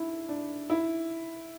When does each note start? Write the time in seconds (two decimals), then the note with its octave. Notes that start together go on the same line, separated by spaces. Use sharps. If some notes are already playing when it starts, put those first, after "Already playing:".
Already playing: D4 E4
0.29 D4
0.70 E4